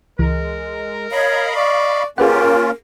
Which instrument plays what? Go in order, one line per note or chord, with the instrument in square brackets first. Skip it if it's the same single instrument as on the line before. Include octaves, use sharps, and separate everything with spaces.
[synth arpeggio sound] C#2 E3 [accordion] G#3 [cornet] A#4
[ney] C#5 [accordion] D#5 F5 B5
[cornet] D5 [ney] C#6
[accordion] A#3 C#4 F4 [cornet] G4 [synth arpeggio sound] G#4 B4 F#5 [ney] A#4